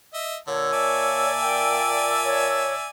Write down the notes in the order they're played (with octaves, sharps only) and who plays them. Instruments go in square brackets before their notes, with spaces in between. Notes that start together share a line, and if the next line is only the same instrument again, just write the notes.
[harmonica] D#5 E5
[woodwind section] A#2 A5 E6 [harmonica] D3 [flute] C#5
[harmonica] D5 E5 G#5
[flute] G5
C#5